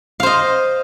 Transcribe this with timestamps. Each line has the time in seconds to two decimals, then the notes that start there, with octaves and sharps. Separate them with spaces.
0.20 F5
0.23 C5
0.26 D#5